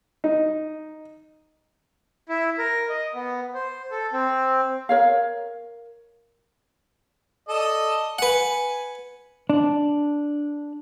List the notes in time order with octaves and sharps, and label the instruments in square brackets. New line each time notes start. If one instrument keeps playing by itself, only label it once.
[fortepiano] D#4
[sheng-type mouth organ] E4
A#4
D#5
B3
C5
A4
C4
[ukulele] A#4 C#5 F5
[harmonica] A4 D5 D#5
[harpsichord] B4 F#5 [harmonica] G#5
[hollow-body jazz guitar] D4